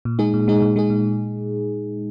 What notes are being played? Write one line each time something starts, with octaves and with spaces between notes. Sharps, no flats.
A#2
G#3 D#4 G#4
A#2
G#3 D#4 G#4
A#2
G#3 D#4 G#4
A#2